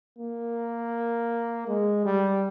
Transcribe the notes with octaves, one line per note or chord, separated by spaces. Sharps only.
A#3
G#3
G3